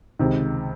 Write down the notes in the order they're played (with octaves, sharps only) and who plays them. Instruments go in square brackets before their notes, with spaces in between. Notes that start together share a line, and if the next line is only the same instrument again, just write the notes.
[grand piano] C#2 C3 D#3